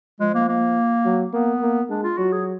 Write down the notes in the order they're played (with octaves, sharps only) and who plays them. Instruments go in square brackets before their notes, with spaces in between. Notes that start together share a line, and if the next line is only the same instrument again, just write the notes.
[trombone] F3 [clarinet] G#3
[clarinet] A#3
A#3
[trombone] F#3
[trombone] A#3 [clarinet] B3
[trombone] A#3
[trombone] G#3 [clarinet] D4
[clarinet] F4
[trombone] F#3 [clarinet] F#4
[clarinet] G#4